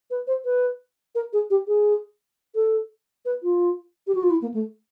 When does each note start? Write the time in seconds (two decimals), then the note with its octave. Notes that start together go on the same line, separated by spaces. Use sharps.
0.10 B4
0.27 C5
0.45 B4
1.15 A#4
1.33 G#4
1.50 G4
1.67 G#4
2.55 A4
3.25 B4
3.43 F4
4.07 G4
4.15 F#4
4.23 F4
4.30 E4
4.42 A#3
4.54 A3